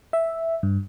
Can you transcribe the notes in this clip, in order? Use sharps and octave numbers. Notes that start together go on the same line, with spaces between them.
E5
G2